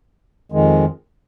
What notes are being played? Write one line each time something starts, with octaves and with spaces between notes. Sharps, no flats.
F2 D#3 G#3